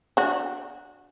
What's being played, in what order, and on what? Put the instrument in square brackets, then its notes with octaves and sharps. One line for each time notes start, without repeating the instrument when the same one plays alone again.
[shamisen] D4 F#4